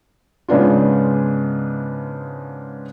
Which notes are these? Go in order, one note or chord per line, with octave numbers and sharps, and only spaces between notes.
G#2 C#3 B3 D4 F4